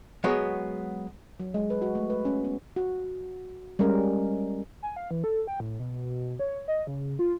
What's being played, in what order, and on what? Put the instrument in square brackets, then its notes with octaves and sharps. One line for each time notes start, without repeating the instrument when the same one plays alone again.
[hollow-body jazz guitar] F#3 G#3 B3 F#4 C#5
[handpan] F#3
G#3
B4
F#4
A3
B4
C#4
B3
F#4
G3 G#3 C#4 A#4
[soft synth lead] G#5
F5
E3
A4
G5
A2
B2
C#5
D#5
C#3
F4